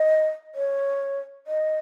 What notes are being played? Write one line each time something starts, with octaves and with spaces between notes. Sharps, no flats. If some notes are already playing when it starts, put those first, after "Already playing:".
Already playing: D#5
C#5
D#5